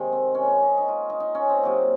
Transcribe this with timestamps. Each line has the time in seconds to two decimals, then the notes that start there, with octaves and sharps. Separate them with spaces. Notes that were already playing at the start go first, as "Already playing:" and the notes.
Already playing: C3 D#3 G#3
0.12 C4
0.35 C#4
0.48 C#4
0.63 D#4
0.77 D#4
0.88 F4
1.10 D#4
1.20 D#4
1.35 C#4
1.49 C4
1.63 C3 F#3 A#3 D#4